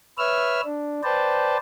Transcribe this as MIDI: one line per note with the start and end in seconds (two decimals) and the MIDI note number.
0.18 0.61 71
0.18 0.61 73
0.18 0.61 76
0.18 0.61 88
0.18 0.61 89
0.64 1.01 62
1.03 1.57 71
1.03 1.57 72
1.03 1.57 74
1.03 1.57 79
1.03 1.57 81